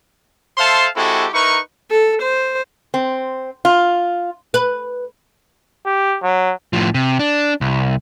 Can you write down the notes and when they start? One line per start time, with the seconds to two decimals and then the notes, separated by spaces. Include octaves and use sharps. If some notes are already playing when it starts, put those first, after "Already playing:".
0.58 A4 C5 E5 F5 A5 C6
0.96 G#3 C4 E4 F#4 G4 A4
1.34 D#4 E4 A#4 B4 C#6
1.91 A4
2.22 C5
2.94 C4
3.65 F4
4.54 B4
5.86 G4
6.23 F#3
6.73 A2 F3
6.94 C3
7.19 D4
7.61 C2